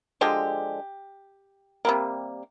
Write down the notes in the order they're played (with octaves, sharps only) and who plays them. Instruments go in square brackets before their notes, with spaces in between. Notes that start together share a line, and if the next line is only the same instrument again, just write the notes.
[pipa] D3 F3 G#3 G4
C3 G3 A#3